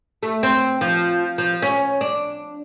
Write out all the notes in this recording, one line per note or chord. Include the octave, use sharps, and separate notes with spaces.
A3
C4
F3
F3
C#4
D4